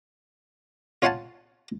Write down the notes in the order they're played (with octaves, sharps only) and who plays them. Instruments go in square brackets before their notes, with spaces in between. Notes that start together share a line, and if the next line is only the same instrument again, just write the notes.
[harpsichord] F4 C#5 F5 F#5 G#5 A5